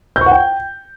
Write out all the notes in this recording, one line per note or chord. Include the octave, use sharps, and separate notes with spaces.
G6
C#6
F#5
G5